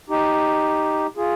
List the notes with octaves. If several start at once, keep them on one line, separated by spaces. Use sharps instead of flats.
D#4 G4
F4 G#4